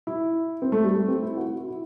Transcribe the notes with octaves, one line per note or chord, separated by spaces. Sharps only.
E4
C4
A3
G3
A3
C4
E4
F#4
F#4
F#4
E4